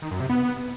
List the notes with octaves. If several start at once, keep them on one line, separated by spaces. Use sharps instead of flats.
D#3
F#2
C3
B3